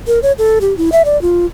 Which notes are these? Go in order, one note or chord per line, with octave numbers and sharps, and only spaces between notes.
A#4
C#5
A4
G4
E4
E5
D5
F4